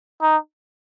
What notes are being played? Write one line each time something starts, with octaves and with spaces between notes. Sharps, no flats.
D#4